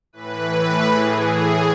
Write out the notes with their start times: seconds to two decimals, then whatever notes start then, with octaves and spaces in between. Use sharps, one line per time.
0.13 A2 E3 B4
0.89 G#4